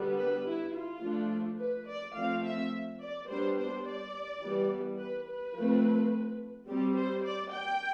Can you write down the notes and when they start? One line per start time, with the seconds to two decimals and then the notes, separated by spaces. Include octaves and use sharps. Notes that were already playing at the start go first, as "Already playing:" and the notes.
Already playing: D3 G3 B3
0.18 B4
0.46 E4
0.74 F4
1.02 F3 A3 D4
1.59 B4
1.87 D5
2.15 F3 A3 C4 F5
2.44 E5
3.00 D5
3.28 G3 B3 D4 C5
3.57 C5
3.85 D5
4.42 E3 G3 B3
4.98 B4
5.26 B4
5.54 F3 A3 C4
6.68 G3 C4 G4
6.96 C5
7.24 D5
7.53 G5